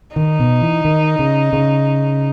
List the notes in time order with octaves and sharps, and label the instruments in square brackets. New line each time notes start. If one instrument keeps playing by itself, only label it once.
[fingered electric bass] D#3 [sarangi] D#4
[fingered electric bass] B2
E3
D#3
C#3
C#3